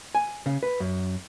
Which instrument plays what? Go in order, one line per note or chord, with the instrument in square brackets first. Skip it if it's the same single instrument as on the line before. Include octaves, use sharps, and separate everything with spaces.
[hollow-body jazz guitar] G#5
C#3
B4
F#2